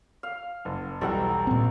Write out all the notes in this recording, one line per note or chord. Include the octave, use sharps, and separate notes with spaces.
F5
F#1
B1 E2 G3 A4 F#5 A#5
A#2 C4